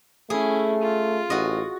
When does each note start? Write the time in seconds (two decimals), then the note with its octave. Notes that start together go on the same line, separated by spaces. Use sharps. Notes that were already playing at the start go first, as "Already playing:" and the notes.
0.30 A3 C#4 E4 G#4
0.81 F4
1.30 A1 F#4 D#5